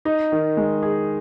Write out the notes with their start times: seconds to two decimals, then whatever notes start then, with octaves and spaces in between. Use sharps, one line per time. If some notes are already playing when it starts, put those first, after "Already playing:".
0.05 D#4
0.32 D#3
0.57 G#3
0.83 G#4